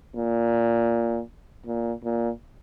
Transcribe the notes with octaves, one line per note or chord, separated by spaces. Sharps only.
A#2
A#2
A#2